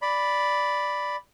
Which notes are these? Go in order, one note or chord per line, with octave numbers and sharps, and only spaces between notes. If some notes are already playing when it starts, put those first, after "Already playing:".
D5 B5